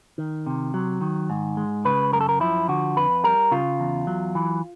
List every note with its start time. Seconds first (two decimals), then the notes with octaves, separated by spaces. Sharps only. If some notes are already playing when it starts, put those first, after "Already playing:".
0.18 D#3
0.46 C3
0.74 F#3
1.01 D#3
1.30 G#2
1.57 G#3
1.85 C#3 B4
2.12 F#2 A#4
2.21 A4
2.29 A#4
2.40 F3 E4
2.68 D3 F#4
2.96 F2 B4
3.23 G3 A#4
3.51 C#3 F4
3.80 E2
4.07 F#3
4.35 E3